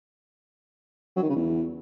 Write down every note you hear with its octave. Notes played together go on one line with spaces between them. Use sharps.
F#3
D#3
C#3
E2